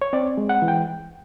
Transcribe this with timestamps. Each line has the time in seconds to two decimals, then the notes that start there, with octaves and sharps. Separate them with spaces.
0.02 C#5
0.13 C4 D5
0.38 G#3
0.49 F#5
0.62 E3
0.68 G5